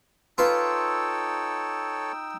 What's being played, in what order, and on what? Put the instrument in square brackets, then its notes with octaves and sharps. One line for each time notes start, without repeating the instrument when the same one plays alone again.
[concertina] D#4 G5 E6 [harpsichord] F4 B4 [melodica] A4 C#5